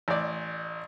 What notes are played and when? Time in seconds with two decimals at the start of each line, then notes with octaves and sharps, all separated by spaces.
0.08 A1 D5